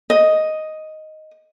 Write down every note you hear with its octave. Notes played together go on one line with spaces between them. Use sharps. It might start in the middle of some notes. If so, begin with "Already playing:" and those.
D#5